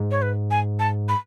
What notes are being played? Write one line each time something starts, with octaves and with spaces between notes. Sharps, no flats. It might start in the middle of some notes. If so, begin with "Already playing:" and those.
Already playing: G#2
C#5
B4
G#5
A5
B5